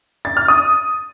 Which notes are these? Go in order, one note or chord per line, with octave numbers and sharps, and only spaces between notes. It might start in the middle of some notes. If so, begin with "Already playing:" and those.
A6
F6
D#6